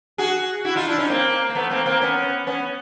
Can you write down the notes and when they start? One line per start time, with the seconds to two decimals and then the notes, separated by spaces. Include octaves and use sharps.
0.18 F#4 G#4
0.65 E4 F#4
0.76 D#4 F4
0.88 D4 E4
0.98 C#4 D#4
1.10 A#3 C4
1.49 A#3
1.55 A3 B3
1.70 A#3 C4
1.86 A#3 C4
2.01 B3 C#4
2.47 B3 C#4